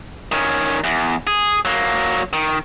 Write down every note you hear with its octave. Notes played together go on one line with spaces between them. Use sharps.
D#3 C#4
E2
G#4
F#3 A#3
D#3